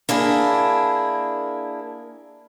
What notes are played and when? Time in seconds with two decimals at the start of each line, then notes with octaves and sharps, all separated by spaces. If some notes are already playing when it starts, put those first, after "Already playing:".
0.09 A#3 D4 E4 G#4